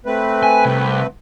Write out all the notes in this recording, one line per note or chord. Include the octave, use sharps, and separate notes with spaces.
A3 C4 B4
G#5
C2